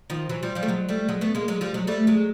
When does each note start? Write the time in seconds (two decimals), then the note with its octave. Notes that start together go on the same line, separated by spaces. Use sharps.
0.10 D#3 F3
0.29 E3 F#3
0.43 F3 G3
0.55 F3 G3
0.63 A3
0.68 F#3 G#3
0.89 G3 A3
1.08 F#3 G#3
1.21 A3 B3
1.35 G#3 A#3
1.48 F#3 G#3
1.61 F3 G3
1.74 F#3 G#3
1.87 G3 A3
2.07 F#3 G#3